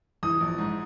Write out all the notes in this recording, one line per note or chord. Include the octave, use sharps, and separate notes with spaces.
E3 D#6
A#1
G#2